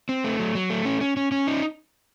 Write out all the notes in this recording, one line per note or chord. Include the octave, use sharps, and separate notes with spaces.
C4
A3
F#3
F#3
A3
C#4
C#4
C#4
C#4
D#4